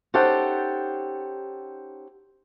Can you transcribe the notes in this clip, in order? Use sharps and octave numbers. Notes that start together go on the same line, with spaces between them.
C#4 D#4 G4 A4 C5 F#5